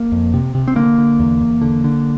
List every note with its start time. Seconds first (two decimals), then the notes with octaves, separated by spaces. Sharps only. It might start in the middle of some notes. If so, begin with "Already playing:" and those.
Already playing: A#3
0.12 F2
0.34 C3
0.55 C3
0.68 C4
0.76 D3 A#3
0.98 D3
1.20 E2
1.41 E2
1.61 D3
1.84 D3